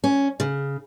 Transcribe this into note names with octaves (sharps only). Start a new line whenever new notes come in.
C#4
C#3